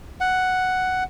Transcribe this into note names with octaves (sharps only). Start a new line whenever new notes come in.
F#5